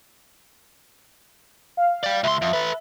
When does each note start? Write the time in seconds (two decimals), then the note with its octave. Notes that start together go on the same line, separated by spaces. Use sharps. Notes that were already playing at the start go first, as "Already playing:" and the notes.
1.77 F5
2.04 D5 G5
2.24 C#2 E5 C6
2.42 F2
2.54 A4 B4